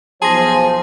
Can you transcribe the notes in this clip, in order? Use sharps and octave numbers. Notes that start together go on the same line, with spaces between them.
B1 F3 G#4 C5 A5 C6 A#6